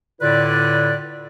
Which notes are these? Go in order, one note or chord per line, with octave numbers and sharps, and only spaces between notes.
A2 D3 E4 F4 B4 D5